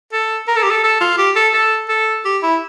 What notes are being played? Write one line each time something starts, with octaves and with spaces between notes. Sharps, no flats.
A4
A#4
A4
G4
A4
A4
F4
G4
A4
A4
A4
G4
E4